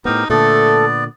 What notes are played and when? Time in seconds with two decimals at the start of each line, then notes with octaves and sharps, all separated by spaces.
0.05 A2 B3 D#4 G4 A#4 C5
0.30 A#2 D3 A3 B3 A4 D5